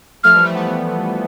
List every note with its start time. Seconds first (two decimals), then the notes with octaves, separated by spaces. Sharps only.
0.24 F3 A3 F6
0.34 E3 G3
0.44 F3 A3
0.54 B3
0.63 A3